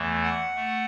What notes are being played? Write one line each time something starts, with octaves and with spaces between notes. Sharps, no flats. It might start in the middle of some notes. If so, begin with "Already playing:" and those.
Already playing: E2 E3 A3
F#5
A3